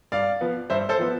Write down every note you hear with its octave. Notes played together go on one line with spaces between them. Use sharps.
G2 D5 F5
F3 B3
G2 C5 E5
A4 C5
F3 B3